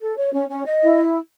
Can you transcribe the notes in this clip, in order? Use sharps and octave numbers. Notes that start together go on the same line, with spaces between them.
A4
C#5
C#4
C#4
D#5
E4